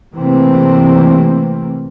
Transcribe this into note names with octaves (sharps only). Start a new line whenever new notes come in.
C3 E3 A3 A#3 C4